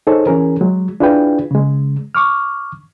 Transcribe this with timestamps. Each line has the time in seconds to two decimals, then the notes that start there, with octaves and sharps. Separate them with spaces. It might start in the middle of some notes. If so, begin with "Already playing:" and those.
0.07 D#4 G#4 A4 C5 C#5
0.27 E3 C#4 G#4 A#4
0.61 F#3 G#3
1.00 D4 E4 F4 G#4 B4 G5
1.51 C#3 G#3
2.15 C#6 D6 F6